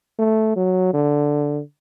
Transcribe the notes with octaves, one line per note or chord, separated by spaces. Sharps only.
A3
F#3
D3